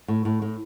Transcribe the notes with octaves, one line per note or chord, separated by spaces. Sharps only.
A2
A2
A2